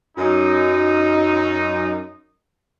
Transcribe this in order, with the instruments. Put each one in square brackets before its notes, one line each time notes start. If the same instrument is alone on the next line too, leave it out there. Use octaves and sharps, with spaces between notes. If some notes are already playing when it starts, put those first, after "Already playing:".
[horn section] F#2 D#4